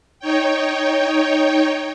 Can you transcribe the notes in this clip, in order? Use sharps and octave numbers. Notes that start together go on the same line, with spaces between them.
D#4 C#5 G5